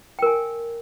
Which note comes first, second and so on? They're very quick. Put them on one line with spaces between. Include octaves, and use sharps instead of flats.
G5 A#4 G#5